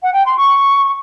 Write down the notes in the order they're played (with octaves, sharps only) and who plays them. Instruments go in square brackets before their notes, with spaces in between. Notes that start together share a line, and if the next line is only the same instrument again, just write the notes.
[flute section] F#5
G5
C6
C#6